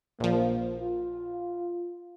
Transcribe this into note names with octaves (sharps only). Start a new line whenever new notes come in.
A#1 F3 A#3
F4